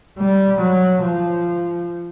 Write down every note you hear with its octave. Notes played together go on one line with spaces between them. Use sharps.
G3
F#3
F3